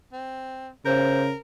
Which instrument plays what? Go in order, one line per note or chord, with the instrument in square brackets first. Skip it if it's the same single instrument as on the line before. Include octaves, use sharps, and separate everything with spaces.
[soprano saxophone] C4
[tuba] C#3 [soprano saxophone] A#4 [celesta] C5 G6